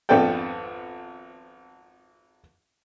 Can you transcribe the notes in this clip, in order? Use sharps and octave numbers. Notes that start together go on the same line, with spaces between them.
G#1 F2 B3 D4 A4 G5